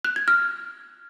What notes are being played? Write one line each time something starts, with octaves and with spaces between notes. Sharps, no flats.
F#6
G#6
F6